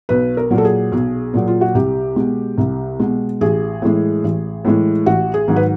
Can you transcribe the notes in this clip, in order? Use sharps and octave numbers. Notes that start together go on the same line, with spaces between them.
B1 B4
A#4
A#2 F#3
A4
G#4
B1
A#2 F#3
F4
F#4
C2 G4
B2 G#3
C2
B2 G#3
A1 G#4
A2 E3 G#3
A1
A2 E3 G#3
A1 F#4
G#4
G#2 D#3 F#3
B4